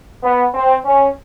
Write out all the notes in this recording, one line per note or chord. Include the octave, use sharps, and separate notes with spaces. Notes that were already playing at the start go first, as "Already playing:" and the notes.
B3
C4
C#4